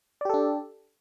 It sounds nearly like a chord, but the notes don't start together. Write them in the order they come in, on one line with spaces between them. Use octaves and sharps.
D5 G4 A4 D4